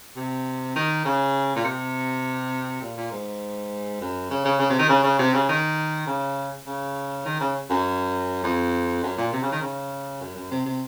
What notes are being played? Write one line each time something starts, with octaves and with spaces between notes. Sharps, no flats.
C3
D#3
C#3
A#2
C3
A#2
A#2
G#2
F#2
C#3
C#3
C#3
C3
D#3
C#3
C#3
C3
C#3
D#3
C#3
C#3
D#3
C#3
F#2
F2
F#2
A#2
C3
C#3
D#3
C#3
F#2
F#2
C3
C3